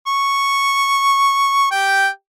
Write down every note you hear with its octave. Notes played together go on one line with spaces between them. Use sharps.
C#6
G4 G5